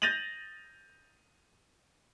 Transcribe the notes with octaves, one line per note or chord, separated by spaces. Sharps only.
G6 A6 A#6 D#7 F7 F#7